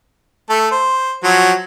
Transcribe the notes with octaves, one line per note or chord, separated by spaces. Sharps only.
A3 A4
C5
F3 F#3 F#4